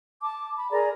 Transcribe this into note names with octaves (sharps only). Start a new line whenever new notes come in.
A5 D6
B5
G#4 A#4 D5 A#5